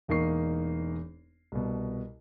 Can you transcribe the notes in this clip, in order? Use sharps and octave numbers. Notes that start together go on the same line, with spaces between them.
E1 E2 A#3 D#4 C#6 C7
C2 B2